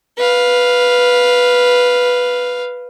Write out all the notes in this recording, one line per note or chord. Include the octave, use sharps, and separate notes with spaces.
B4 F5